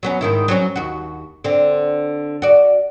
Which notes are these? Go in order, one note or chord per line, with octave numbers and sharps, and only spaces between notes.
F#3 B3 C#4
G#2 D#3 E4
F#3 C4 C#4
D#2 F#4
D3 C4
F#4 D5